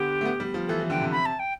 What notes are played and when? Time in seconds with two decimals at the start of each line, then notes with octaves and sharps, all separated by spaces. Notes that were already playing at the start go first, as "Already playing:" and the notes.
Already playing: D3 B3 G4
0.21 A3
0.25 B3
0.40 G3
0.54 F3
0.68 E3 A4
0.80 E3
0.90 D3 G5
1.01 C3
1.12 B5
1.26 A5
1.39 G5